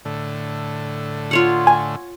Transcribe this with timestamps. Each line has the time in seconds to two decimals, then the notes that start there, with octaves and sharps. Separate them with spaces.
0.05 A2 D3
1.31 F4 C#5 F#5
1.67 G#5